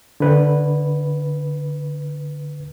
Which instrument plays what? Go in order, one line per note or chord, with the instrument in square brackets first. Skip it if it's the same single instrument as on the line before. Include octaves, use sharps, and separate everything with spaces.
[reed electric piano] D3 B4